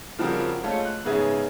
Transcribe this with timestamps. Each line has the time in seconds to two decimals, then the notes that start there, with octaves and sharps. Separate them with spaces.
0.18 C#3 F3 G3 C4 F#4 A#4
0.63 G#3 A3 C#4 F4 A4
0.85 F#6
1.05 G#2 C#3 B3 G#4 C#5 E5